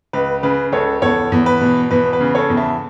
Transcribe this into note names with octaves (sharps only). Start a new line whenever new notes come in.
C#2 B4
C#3 B4
C#2 A4 C#5
E2 A4 C#5
E2
B4
B2
E2 B4
B4
C#3
A4 C#5
E2
E5 A5